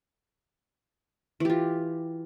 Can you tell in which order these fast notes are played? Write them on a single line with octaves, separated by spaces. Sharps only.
E3 G4 F4